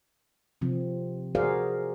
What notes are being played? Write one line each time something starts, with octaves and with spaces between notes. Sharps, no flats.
C3 F3 C4
F#4 G#4 A#4 C5 D5 F5